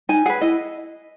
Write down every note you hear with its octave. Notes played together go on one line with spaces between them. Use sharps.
D#4 G#5
G#4 B4 F#5
E4 D#5